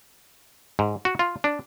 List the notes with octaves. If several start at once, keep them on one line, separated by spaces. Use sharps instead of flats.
G#2
F#4
F4
D4